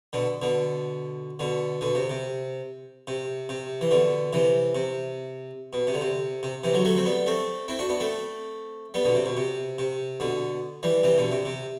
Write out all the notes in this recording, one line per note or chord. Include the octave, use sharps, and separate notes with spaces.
B2 D3
B2 D3
B2 D3
B2 D3
C3
C3
C3
C3
E3
B2 D3
C3 E3
C3
B2
C3
D3
C3
C3
C3 E3
D3 F#3
F#3 A3
C4
G3 B3
A3 C4
C4 E4
D4 F#4
B3 D4
A3 C4
G3 B3
B2 D3
C3
B2
C3
C3
B2 D3
E3 G3
C3 E3
B2 D3
C3
C3